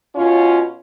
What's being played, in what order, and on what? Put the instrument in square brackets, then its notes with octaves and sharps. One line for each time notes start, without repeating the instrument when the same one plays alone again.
[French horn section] B2 C#4 F4